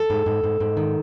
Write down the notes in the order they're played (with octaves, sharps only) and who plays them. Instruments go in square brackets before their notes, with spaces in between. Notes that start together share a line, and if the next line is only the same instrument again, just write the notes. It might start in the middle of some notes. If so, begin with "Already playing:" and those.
Already playing: [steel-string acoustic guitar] A4
G#2
G#2
G#2
G#2
D#3